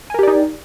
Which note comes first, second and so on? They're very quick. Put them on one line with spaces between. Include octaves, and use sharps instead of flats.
G#5 A#4 G4 D5 D#4